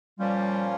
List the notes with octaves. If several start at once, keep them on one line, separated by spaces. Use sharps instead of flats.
A#2 F3 G3 A#3 C#4 F4